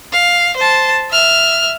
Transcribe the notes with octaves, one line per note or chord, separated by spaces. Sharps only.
F5
C5 A5
E5 F6